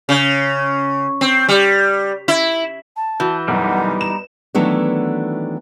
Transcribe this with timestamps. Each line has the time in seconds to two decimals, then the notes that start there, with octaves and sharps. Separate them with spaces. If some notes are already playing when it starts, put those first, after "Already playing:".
0.09 C#3
1.21 C4
1.49 G3
2.28 E4
2.96 A5
3.20 E3 F#4 G6
3.48 B1 F#2 G3 B3 D#4 F#5
4.01 A#5 E7
4.55 D#3 E3 F#3 A3 B3 D4